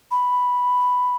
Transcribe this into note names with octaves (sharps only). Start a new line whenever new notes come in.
B5